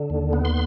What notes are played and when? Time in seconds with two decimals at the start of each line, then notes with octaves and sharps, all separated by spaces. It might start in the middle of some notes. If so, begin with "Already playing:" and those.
Already playing: D3
0.10 D#2
0.33 B3
0.45 C6